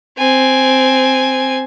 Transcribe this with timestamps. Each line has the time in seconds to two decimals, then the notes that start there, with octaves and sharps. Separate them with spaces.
0.18 C4 G#5